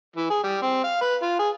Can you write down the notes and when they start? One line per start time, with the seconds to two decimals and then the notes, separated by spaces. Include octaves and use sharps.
0.16 E3
0.30 G#4
0.44 G3
0.62 C4
0.84 F5
1.02 B4
1.23 F4
1.39 G#4